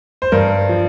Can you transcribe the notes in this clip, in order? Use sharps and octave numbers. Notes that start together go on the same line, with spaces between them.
C5
G2 A#4
F3